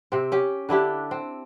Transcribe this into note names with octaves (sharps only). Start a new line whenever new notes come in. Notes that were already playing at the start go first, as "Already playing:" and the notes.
C3 C4
C#4 G4
D3 D4 E4 G4
C4